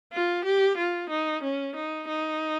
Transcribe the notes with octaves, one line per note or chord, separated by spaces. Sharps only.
F4
G4
F4
D#4
C#4
D#4
D#4